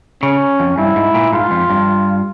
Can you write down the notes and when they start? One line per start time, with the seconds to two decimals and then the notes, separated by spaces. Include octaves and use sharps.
0.23 C#3 C#4
0.60 F2
0.78 G2 E4
0.96 G#2
1.14 A#2
1.33 G#2 F4
1.51 F2
1.70 G2